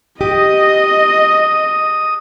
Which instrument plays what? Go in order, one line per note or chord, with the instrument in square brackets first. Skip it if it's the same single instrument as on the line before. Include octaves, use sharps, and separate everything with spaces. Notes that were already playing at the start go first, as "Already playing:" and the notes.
[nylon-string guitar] G4 [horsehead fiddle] D#5 [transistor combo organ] D#6